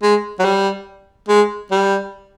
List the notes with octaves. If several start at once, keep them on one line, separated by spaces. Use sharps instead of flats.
G#3
F#3
G3
G#3
G3